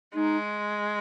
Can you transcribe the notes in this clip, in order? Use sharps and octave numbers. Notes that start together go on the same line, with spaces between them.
G#3 D#4